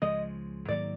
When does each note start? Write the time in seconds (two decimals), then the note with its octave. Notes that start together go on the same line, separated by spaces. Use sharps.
0.02 C#2 C#3 F3 G#3 D#5
0.68 G#2 D#3 F#3 A#3 D5